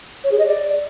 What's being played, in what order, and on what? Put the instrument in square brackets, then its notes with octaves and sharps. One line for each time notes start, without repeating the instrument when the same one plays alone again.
[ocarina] C#5
G#4
D#5
D5